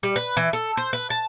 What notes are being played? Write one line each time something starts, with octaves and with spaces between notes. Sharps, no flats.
G3
B4
E3
A4
C5
B4
A5